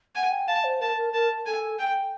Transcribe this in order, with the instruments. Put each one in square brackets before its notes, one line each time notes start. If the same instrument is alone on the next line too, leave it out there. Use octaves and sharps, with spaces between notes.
[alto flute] F#5 [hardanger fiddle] G#5
[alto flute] G5
[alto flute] F5 [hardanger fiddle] A5
[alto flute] C5
[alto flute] A#4 [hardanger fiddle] A5
[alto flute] A#4
[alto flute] A#4 [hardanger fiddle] A5
[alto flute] A4 [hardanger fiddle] G#5
[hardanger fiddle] G5